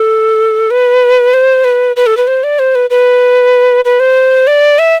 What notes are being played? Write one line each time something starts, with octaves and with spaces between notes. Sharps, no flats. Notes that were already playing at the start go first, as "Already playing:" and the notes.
Already playing: A4
B4
C5
B4
B4
A4
B4
C5
D5
C5
B4
B4
B4
C5
D5
E5